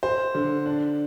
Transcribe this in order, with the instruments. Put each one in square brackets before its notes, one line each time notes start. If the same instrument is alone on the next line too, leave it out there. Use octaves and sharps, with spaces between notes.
[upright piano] C5
D3
D4